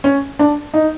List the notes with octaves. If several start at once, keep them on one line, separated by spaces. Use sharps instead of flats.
C#4
D4
D#4